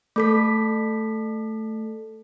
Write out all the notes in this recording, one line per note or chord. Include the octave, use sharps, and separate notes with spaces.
A3 A4 B6